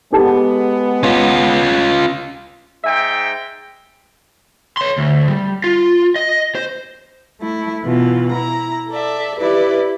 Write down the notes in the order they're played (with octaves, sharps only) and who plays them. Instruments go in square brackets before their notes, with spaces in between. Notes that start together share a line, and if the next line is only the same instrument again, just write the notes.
[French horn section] G#3 B3 [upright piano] G4 A4 A5
[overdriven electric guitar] C#4 F4
[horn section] G#2 E5 G5
[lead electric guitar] C#5 C6
D2
G3
F4
D#5
C5
[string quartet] A3 E4
B2 E3 F4
E4 A#5
A4 D5 E5
E4 G4 B4 D5